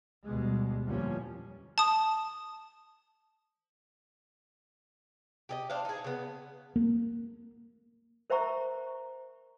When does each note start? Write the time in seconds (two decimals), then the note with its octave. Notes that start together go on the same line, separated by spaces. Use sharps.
0.23 D2 B2 G3 G#3
0.86 E2 A#2 D3 F3 G3 C#4
1.78 A5 D#6
5.49 G4 G#4 D#5
5.70 D4 C5 F5
5.85 D#4 G#4
6.04 C#3 B3
6.76 A#3
8.30 A#4 C5 E5 F#5 A#5 C#6